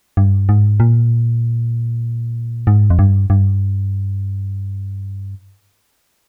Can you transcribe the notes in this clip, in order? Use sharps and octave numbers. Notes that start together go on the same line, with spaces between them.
G2
G#2
A#2
G#2
F2
G2
G2